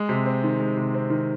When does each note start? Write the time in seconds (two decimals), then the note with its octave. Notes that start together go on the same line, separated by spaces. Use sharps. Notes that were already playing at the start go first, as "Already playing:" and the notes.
Already playing: G#3
0.09 C3
0.26 C4
0.44 D#3
0.60 G#3
0.77 C3
0.94 C4
1.10 D#3